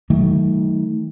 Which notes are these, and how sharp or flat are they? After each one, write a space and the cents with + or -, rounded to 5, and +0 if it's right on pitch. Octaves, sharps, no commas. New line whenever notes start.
D#3 +30 F#3 +35 A3 +0